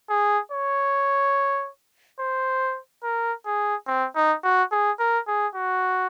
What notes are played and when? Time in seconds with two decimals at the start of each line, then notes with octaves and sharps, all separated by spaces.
0.10 G#4
0.52 C#5
2.20 C5
3.03 A#4
3.46 G#4
3.87 C4
4.16 D#4
4.44 F#4
4.72 G#4
4.99 A#4
5.27 G#4
5.55 F#4